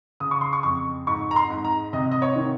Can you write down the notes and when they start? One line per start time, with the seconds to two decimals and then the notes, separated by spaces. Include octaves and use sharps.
0.20 C#3 D#6
0.31 C#6
0.41 C6
0.53 C#6
0.63 F2 C#6
1.07 G#2 C#6
1.31 A#5
1.36 C6
1.50 G#2
1.65 A#5
1.93 C3 D#5
2.12 D#5
2.22 C#5
2.36 D#3